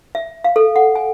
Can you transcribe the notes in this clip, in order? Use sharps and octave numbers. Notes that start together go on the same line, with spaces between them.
E5
F5
A4
F#5
G#5